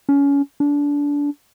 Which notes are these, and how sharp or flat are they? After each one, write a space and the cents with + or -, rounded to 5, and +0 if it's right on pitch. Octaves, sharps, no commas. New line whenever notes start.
C#4 +25
D4 -25